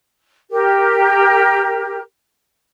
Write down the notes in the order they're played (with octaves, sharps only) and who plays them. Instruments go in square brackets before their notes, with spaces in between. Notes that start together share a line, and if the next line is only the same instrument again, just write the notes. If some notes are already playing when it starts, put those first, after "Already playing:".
[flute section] G4 A#4